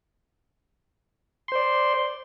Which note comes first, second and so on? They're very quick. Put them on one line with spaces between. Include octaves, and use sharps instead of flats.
C6 C5 D5